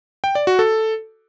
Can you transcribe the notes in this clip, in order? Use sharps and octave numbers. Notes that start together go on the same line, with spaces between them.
G5
D5
F#4
A4